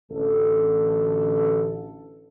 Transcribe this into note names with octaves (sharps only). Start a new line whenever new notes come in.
A1 D2 A4